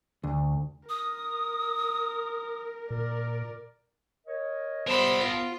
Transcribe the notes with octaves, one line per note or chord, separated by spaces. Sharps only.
D2
A#4 D#6
A#2 A#4 D5
A#4 C#5 D#5
C3 G3 B3 A#4 C5 A5 B5
B3 F4